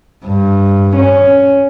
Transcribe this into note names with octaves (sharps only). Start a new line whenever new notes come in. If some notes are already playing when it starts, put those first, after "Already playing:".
G2
C#4